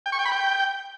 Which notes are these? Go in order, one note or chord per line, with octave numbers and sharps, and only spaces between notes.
G5
C#6
G5
B5
G5